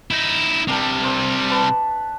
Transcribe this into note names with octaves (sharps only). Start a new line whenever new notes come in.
D#4 E4
C3 G3 D4 A#4
C4 A#4
B4 A5